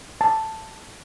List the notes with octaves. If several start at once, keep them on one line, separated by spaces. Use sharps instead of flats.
A5